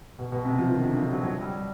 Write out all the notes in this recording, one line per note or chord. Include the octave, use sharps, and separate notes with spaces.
B2
B2
C3
F3
D#3
D3
F3
F#3
F#3
G3